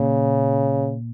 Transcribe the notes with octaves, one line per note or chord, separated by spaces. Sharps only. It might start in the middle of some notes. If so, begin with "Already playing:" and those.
Already playing: A#2 C#3